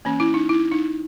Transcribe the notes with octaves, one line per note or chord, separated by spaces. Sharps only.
E3 A#3 C#4
E4
D#4
E4
D#4